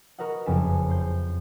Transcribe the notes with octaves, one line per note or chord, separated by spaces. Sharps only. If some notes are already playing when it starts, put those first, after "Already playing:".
F#4 A#4 B4 D#5 F#5
F#1 F2 B4 G#5 B6 E7
C5 G6